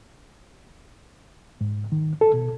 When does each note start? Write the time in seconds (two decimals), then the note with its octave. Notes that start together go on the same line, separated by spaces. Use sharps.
1.61 G#2
1.92 D#3
2.21 A4
2.34 B2